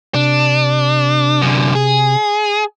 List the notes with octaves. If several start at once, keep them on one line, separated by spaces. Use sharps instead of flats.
C3 D4
F#2 D3
G#4